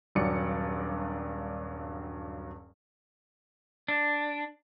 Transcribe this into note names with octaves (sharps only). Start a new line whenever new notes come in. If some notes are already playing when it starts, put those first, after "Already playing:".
D#1 G2 F#3 D5 C#7
D4